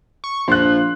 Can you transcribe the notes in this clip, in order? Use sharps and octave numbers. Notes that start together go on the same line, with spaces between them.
C#6
A#1 F3 C6 F#6